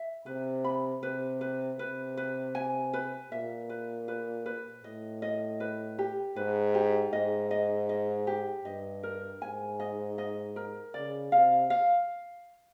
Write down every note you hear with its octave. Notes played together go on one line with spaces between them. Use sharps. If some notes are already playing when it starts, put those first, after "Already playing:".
Already playing: E5
C3 B4
B5
C3 B4
B4
C3 B4
B4
G#5
B4
A#2 E5
B4
B4
B4
A2 D#5
D#5
B4
G4
G#2 B4
G4
G#2 D#5
D#5
D#5
G4
G2 D#5
A#4
G#2 G#5
D#5
D#5
A#4
C#3 D5
C3 F5
F5